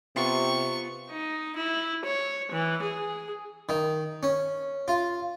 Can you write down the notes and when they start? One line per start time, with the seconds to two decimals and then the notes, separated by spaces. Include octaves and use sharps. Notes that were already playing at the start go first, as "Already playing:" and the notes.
0.16 C3 B3 F4 C#6
1.11 D#4
1.56 E4
2.05 C#5
2.52 E3
2.83 G#4
3.69 D#3
4.23 C#4
4.88 F4